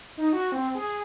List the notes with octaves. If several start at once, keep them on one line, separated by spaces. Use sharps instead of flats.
D#4
F#4
C4
G#4